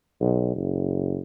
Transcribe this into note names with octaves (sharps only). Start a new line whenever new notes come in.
B1
F#1